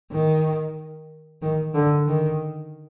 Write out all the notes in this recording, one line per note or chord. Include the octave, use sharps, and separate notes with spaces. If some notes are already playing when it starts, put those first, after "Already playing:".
D#3
D#3
D3
D#3